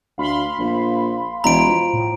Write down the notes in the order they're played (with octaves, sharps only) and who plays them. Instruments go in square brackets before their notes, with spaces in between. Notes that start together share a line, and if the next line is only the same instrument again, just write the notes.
[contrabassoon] D2 [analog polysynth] F5 B5 C6
[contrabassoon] A#1
[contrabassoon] E1 [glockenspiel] A#5 D7
[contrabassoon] F3
[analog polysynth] A2